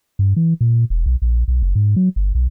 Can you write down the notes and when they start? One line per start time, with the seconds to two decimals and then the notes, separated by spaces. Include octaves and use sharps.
0.19 G2
0.36 E3
0.61 A#2
0.90 E1
1.06 B1
1.22 A#1
1.48 B1
1.62 F#1
1.75 G#2
1.96 F#3
2.16 G1
2.35 B1